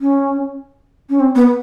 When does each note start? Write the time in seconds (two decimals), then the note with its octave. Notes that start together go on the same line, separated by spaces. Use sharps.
0.01 C#4
1.10 C#4
1.20 C4
1.35 B3